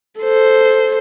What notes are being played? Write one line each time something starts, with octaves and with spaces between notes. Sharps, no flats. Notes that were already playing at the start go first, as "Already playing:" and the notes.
A4 C5